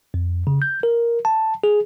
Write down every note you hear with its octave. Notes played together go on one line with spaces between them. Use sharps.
F2
C#3
G6
A#4
A5
G#4